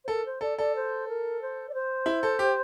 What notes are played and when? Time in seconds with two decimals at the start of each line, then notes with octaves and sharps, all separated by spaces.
0.04 C5
0.08 A4 A#4
0.25 C5
0.41 A4 D5
0.57 A4 D5
0.75 C5
1.07 A#4
1.41 C5
1.69 D5
1.73 C5
2.06 E4
2.23 A4
2.39 G4